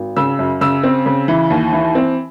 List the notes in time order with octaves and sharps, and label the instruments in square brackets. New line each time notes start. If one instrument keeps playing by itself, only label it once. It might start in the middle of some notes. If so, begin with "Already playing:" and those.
Already playing: [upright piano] G#1
C#3 E6
F#2
C#3 E6
C4
C#3
E3
D#2
E3
C4